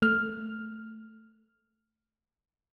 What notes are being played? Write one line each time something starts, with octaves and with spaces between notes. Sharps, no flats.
A3 F6